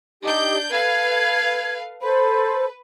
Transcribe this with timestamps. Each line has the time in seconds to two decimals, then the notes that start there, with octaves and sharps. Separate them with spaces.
0.22 D4 D#4 G4 G6
0.71 A4 B4 F5 G#6
2.02 A4 B4 C5 B5